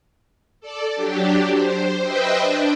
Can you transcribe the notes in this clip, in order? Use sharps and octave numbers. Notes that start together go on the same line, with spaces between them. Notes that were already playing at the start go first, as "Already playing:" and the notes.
A4 D5
F#3 D4 G4
C5
B4 C5 D#5 E5 G5
D4